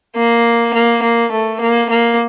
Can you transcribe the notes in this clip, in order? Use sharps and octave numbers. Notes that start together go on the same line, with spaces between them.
A#3
A#3
A#3
A3
A#3
A#3